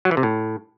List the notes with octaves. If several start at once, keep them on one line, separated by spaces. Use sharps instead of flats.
F#3
E3
C3
A2